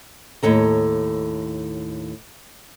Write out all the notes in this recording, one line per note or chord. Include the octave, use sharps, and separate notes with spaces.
D#2 A2 A4 A#5